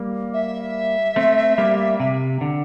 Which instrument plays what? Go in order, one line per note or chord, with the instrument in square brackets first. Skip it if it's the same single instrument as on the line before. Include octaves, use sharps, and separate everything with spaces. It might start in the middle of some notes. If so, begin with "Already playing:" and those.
Already playing: [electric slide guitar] G3 A#3
[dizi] E5
[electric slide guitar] A3 C4
G3 A#3
C3
D3